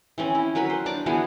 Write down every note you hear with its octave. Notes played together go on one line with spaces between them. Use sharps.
E3 C4 C#4
E4
F#3 A#4 B4 B5
C5
D4 D5 A5 D6
E3 B3 F#4 G#4